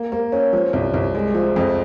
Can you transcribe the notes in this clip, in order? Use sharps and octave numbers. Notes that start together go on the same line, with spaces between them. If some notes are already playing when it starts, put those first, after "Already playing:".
Already playing: A#3
A#3
C#4
F3
C2
C2
G#3
F3
F2